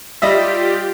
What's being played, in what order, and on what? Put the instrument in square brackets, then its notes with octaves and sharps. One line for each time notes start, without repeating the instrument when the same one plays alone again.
[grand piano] G3 D#5 E5 [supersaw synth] F4 G4